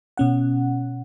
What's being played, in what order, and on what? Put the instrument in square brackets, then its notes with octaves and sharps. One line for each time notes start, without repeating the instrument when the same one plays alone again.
[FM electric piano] B2 C#4 F#5